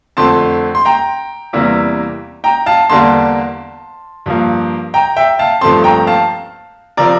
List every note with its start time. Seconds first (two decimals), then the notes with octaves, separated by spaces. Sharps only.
0.17 F2 D3 A3 C4 A5 C6
0.75 C6
0.85 G5 A#5
1.53 E2 C3 E3 G3 A#3
2.44 G5 A#5
2.66 F5 A5
2.90 E2 D3 G3 A#3 D4 A5 C6
4.26 G2 F3 A#3
4.94 G5 A#5
5.16 E5 G5
5.39 F5 A5
5.61 G2 F3 A3 C4 A5 C6
5.84 G5 A#5
6.07 F5 A5
6.97 C3 F3 C4 A#4 D5